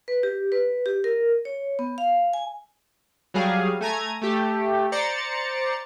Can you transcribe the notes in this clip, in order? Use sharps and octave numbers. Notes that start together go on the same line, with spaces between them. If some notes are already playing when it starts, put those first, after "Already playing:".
B4
G4
B4
G4
A#4
C#5
B3
F5
G#5
F#3 G3 G#4 F5
A3 G#5 A#5 G#6
A3 G4
C5 D5 A#5 A6 C#7